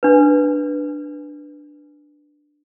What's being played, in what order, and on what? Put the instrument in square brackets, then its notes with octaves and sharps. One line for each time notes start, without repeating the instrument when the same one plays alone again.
[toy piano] D4 B4